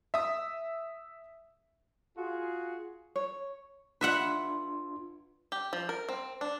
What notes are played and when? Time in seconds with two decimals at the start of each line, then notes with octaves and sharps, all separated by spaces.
0.14 E5 D#6
2.14 F4 F#4 G#4
3.16 C#5
4.01 D4 F4 B4 E5 F#5 C6
5.52 G4
5.73 F3
5.89 A#4
6.09 C4
6.41 D4